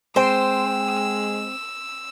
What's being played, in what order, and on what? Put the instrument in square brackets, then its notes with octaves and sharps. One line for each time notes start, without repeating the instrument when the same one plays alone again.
[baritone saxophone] G#3 [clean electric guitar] C4 [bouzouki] C5 [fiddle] E6